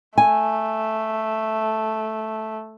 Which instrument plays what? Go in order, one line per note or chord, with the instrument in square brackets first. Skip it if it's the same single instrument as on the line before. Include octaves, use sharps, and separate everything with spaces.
[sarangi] A3 [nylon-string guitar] G#5